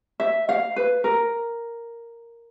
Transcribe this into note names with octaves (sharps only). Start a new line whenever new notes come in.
E5
F5
B4
A#4